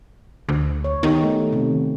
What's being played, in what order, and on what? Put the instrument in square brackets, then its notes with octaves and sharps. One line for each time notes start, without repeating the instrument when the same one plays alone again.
[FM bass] D2
[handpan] C#5
[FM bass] D#3 [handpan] B3 D#4 G4
[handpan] A3
C3